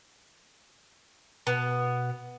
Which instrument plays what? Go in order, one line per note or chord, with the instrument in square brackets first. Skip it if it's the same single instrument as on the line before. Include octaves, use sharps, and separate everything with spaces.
[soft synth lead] B2 [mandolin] B3